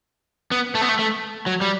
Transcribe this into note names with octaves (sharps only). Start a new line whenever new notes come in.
B3
A3
B3
A3
A3
F#3
G3